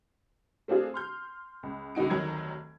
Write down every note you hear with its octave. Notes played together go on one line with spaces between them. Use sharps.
A3 C4 D4 F4 G#4
C6 F6 G6
C#2
C#2 D3 D#4 F#4 D7
F1 D2 D#3 F#3 A#5 G#6